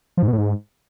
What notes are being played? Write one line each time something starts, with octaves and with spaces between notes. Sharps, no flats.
F3
G#2
B2
A2
G#2